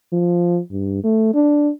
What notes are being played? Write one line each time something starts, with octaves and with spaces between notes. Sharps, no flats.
F3
G2
A3
D4